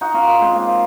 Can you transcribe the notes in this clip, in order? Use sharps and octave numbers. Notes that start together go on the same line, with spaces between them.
D#4 F#4
C#4 F4
G#3 C4
A#3